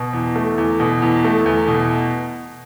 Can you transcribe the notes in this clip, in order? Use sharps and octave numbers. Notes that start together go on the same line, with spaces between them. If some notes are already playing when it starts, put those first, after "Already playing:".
Already playing: B2
E2
A3
E2
B2
E2
A3
E2
B2